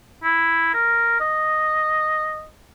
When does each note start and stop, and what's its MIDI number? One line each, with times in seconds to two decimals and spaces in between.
0.24 0.73 64
0.74 1.18 70
1.20 2.47 75